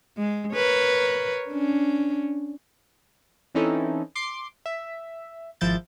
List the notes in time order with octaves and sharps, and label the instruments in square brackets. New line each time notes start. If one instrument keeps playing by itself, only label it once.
[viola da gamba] G#3
A#4 B4 C#5
C#4 D4
[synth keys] E3 C4 C#4 D#4 E4 A4
C6 D6 C7
E5
G#1 F3 E4 G6 A6